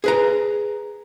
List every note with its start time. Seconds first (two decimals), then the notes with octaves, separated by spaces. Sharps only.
0.04 G#4 B4 A#5